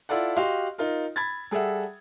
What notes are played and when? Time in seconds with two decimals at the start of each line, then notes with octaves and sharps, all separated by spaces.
0.09 E4 F4 A4 D5 F#5
0.36 F#4 G4 D#5 F5 C6
0.78 D#4 F4 A#4
1.16 B5 G#6 A6
1.51 G3 G#4 A4 E5 F#5